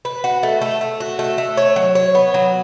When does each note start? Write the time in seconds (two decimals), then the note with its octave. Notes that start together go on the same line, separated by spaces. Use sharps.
0.05 B4
0.24 F#4
0.43 A3
0.61 A3
0.81 A3
1.00 F#4
1.19 A3
1.38 A3
1.57 C#5
1.76 F#3
1.95 C#5
2.15 B3
2.34 F#3